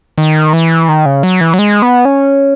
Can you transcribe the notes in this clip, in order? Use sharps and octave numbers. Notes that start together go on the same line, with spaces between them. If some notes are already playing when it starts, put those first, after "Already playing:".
D#3
E3
D#3
C#3
F#3
E3
F#3
G#3
B3
C#4